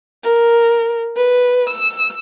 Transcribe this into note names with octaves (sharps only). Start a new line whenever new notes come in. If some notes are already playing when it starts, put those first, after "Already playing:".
A#4
B4
E6